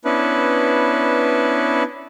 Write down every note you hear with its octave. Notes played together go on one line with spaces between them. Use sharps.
B3 C#4 D4 E4 B4